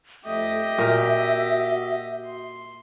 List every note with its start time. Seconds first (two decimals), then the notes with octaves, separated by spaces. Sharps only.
0.25 F2 A3 G4 D#5 E5
0.78 A#2 F#4 A#4
2.25 C6